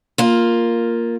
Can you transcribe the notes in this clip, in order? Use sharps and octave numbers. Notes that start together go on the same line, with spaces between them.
A#3 F4